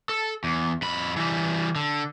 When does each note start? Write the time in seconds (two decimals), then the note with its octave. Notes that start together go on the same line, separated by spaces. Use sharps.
0.09 A4
0.44 E2
0.82 F2 B5
1.17 E3 G3
1.76 D3